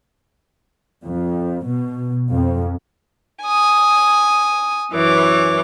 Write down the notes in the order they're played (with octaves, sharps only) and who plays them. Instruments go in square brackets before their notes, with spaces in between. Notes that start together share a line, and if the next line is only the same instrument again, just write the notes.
[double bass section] F2
B2
F2
[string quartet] G#5 D#6
F#2 E3 C#5 D6